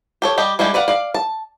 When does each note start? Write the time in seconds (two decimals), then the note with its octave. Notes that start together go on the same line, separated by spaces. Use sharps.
0.22 G4 A4 C#5
0.38 G3 G4 D#5
0.59 G3 G#3 D4 E4 G4
0.74 B4 D5 F5 F#5
0.88 D5 F5
1.14 A5